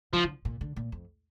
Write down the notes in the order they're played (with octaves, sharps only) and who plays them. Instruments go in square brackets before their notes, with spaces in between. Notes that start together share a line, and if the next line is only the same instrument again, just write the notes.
[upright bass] D3 [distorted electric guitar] F3
[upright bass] D3
A#2
D3
A#2
F2